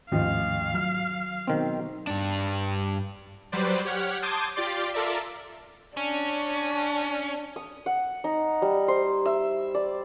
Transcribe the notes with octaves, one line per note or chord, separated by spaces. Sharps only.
A1 D#2 G#2 D#3 F3 D#5 F5
F#3 F6
B2 D#3 C4
G2 D4
F#3 G3 B4 C5 D5
G4 C#5 F#5 F6
A5 C6 D6 D#6 G6 G#6
F4 G4 D5 C6 D6 A6
F4 A4 A#4 D5 E5
C#4 D4
D#6
F#5
D#4
G3
C5
E5
D5